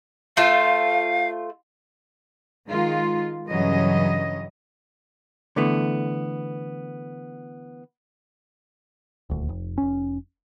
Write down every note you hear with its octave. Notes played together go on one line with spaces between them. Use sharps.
A3 F4 C5 F5
D#3 G#3 F4
G2 C#3 E3 F#3 C#4 D#5
D3 E3 A3 B3
D#1 D2
F1
F1 C#4